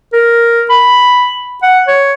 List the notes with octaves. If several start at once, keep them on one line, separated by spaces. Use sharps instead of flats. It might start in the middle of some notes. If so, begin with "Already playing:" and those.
A#4
B5
F#5
C#5